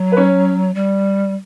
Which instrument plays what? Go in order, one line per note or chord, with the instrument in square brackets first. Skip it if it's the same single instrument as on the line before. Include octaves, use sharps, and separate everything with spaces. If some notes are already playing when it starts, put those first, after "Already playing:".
Already playing: [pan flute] F#3
[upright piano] B4
C#4 C#5
[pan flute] G3